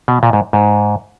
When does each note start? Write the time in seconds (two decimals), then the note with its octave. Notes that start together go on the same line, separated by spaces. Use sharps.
0.08 B2
0.23 A#2
0.33 G#2
0.53 G#2